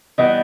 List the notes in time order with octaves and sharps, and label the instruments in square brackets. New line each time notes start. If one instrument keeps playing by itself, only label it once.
[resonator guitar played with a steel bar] E3 G3 B3 [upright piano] D#5